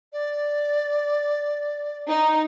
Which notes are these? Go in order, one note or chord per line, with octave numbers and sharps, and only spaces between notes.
D5
D#4